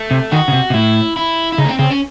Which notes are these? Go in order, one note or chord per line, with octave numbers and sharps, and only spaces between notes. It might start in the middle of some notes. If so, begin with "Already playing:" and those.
Already playing: A3
C3
D#3 F#4
C#3
C3
C3
A2 E4
E4
E4
C#3 D#4
A3
C4
C#3 C4
C#4